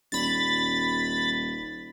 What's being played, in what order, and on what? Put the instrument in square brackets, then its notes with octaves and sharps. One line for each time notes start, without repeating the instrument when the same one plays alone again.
[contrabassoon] D#1 [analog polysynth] B5 A6